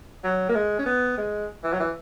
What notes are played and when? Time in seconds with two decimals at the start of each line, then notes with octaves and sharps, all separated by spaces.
0.24 F#3
0.49 A#3
0.55 G#3
0.78 C#4
0.86 B3
1.17 G#3
1.64 E3
1.73 F#3
1.80 E3